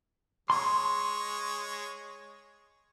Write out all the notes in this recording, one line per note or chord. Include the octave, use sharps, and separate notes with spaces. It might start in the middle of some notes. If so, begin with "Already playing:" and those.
G#3 C#5 C6